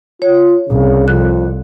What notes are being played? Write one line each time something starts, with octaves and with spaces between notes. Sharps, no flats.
F4 C#5
C2 C#3
F2 F#6